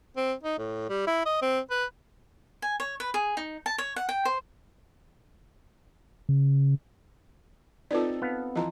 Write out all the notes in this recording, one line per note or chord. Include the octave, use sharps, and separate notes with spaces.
C4
D#4
A2
G3
E4
D#5
C4
B4
G#5
C#5
B4
G#4
D#4
A5
C#5
F#5
G5
C5
C#3
C4 D#4 F4 A4 B4 D5
B3 F5
E3 F3 D#5 A#5